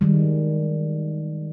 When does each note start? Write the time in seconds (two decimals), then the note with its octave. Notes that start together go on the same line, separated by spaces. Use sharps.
0.01 D#3 G3 G#3